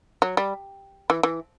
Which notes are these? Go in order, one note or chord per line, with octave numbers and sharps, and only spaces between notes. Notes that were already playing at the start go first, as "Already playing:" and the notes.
F#3
G3
E3
E3